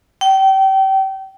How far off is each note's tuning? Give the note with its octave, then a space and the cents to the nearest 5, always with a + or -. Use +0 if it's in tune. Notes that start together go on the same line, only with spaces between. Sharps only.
G5 -30